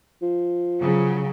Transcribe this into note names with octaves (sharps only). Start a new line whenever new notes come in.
F3
C#3 F#3